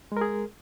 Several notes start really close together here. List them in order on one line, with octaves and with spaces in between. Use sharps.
G#3 A#4 G#4